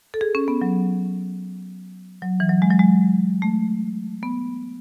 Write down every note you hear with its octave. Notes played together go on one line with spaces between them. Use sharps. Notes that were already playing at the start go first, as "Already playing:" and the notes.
A4
G#4
C#4
B3
F#3
F#3
E3
F#3
G#3
F#3
G#3
A3
B3